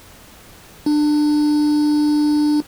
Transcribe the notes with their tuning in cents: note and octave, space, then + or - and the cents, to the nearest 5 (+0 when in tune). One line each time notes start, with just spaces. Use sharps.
D4 +25